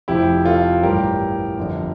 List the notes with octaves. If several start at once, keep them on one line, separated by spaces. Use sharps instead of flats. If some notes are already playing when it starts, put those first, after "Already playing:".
F1 F2 C3 F3 E4 G4
F4 A4
A1 G2 E3 G3 G4 A#4
G1 F2 D3 F3